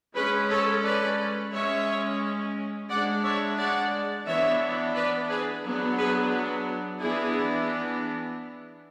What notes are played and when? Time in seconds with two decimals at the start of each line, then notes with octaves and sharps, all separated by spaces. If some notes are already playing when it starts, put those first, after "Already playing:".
0.15 G#3 C#4 G#4 B4
0.50 A4 C#5
0.84 B4 D5
1.52 G#3 C#4 C#5 E5
2.89 G#3 D4 D5 F#5
3.24 C#5 E5
3.58 D5 F#5
4.26 E3 B3 D4 C#5 E5
4.95 B4 D5
5.29 G#4 B4
5.63 F#3 B3 D4
5.97 G#4 B4
7.00 E3 B3 D4 E4 G#4